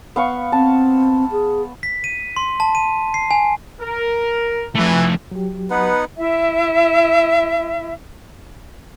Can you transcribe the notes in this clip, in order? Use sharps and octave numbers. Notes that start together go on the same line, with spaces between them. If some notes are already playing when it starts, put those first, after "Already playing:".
B3 F5 C#6
C4 A5
G#4
B6
D#7
C6
A5
D#7
C7
G#5
A#4
F2 E3 A3
F#3 G4
B3 D#4 B4 F#5
E4 E5